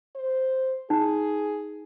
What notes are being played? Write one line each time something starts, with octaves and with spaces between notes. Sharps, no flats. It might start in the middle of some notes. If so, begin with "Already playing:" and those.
C5
D#4 G#4